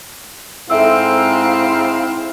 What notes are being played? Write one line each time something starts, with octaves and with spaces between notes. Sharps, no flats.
G#2 C4 E4 A4 E5 F5 E6